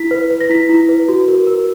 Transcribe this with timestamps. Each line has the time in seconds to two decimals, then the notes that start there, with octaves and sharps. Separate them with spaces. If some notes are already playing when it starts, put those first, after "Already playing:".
Already playing: E4 B6
0.11 B4
0.31 B4
0.41 A#6
0.50 E4 B6
0.69 E4
0.89 B4
1.09 F#4
1.28 A#4
1.47 A#4